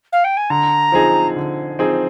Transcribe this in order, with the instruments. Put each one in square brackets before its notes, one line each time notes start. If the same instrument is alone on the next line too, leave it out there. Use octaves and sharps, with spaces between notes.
[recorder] F5
G5
G#5
[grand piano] D3 [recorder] A#5
[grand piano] F3 C4 D#4 G#4
D3
F3 C4 D#4 G#4